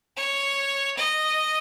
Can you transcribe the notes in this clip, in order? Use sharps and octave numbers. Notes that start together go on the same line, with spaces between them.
C#5
D#5